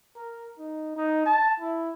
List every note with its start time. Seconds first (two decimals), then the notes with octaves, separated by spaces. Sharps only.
0.16 A#4
0.58 D#4
0.96 D#4
1.26 A5
1.60 E4